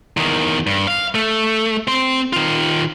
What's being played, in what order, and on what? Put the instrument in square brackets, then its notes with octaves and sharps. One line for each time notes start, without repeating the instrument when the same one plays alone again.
[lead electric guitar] E2 D#3
G2
F5
A3
C4 C6
D#3 F4